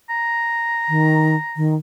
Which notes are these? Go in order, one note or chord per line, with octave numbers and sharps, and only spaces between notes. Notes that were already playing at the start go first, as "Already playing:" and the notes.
A#5
D#3
D#3